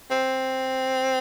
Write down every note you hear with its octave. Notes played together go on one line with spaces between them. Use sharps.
C4